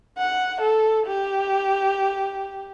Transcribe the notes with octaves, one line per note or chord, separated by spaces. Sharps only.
F#5
A4
G4